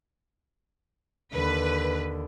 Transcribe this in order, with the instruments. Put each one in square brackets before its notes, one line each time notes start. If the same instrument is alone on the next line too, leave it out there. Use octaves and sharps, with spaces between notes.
[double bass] D#2 D3 [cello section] B4